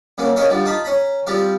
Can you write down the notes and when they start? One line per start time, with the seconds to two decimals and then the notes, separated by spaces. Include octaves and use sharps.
0.18 C#3 F#3 A#3 C#4
0.36 C#4 D#4 A#4 C#5 E5 F5
0.50 D3 F3 G3
0.65 D#4 F4 A5 B5
0.84 C#4 A#5 B5
1.27 F3 G3 C4 G4 F5